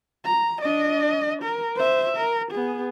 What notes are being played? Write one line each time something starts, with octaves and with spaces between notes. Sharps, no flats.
A#5
D4 D#5
A#4
C5 E5
A#4
B3 G#4